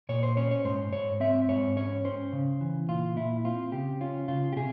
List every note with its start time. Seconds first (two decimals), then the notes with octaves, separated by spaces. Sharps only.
0.09 A#2 C#5
0.23 C5
0.37 C#4 C#5
0.51 C#5
0.65 G#2 C5
0.92 G#2 C#5
1.20 C4 E5
1.49 G#2 C#5
1.76 C#4 C#5
2.05 C#4 C5
2.33 C#3
2.61 E3
2.88 A#2 F4
3.16 A#2 E4
3.45 C4 F4
3.72 C#3 G4
4.01 C#4 F4
4.28 C#3 F4
4.52 G4
4.56 C3 G#4